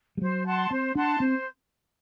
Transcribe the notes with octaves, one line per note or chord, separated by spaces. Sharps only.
G3
F#3 C5
F#5 A5 C6
C4 C5
D4 F#5 A5 C6
C4 C5